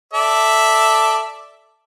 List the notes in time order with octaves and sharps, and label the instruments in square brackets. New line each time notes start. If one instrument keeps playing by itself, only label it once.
[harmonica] A4 D5 E5